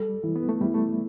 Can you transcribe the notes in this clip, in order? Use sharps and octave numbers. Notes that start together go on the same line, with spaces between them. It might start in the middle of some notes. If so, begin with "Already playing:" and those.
Already playing: G3 A4
E3
B3
A3
G3 E4
A3